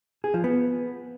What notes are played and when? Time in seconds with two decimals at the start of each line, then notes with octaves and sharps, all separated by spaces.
0.24 G#4
0.34 F3
0.44 B3